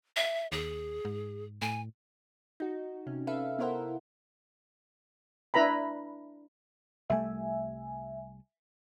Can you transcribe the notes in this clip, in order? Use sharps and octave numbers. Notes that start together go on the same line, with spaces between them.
E5
D#2 G#4
G#2
A2 G#5
D#4 F#4
C3 C#4
A4 B4 E5 F5
B3 E4 A#4 C5 E5 F#5
D4 E4 B4 A#5 B5
C2 G3 A3 E5 G#5